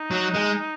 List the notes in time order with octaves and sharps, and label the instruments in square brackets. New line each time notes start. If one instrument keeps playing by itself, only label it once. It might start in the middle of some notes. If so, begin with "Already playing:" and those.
Already playing: [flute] D#4
[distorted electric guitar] F#3
G#3